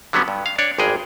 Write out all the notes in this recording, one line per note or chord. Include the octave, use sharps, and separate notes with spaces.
D3 F#3 G3 B3 C#4
G2
F5
D4 C#5 D5
G#1 G2 G3 G#3 G#4 G5